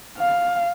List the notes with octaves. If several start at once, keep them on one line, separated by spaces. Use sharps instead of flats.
F5